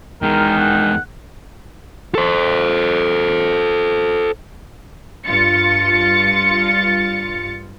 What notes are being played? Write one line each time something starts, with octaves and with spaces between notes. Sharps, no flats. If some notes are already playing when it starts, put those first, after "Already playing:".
E2 D#3 G#3 A#4
F#5
A4 C5
G2 F4 A6 C#7